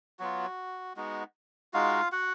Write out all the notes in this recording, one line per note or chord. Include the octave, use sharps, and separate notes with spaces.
F#3 B3 F4 F#4
G#3 B3 D#4 F#4
G#3 D#4 F4 F#4 F5
F#4 F#5